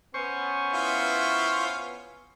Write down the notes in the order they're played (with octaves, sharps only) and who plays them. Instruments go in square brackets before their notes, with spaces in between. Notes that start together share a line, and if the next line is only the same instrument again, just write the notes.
[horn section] B3 C#4 [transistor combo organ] C5 C#6
[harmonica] E4 F4 F5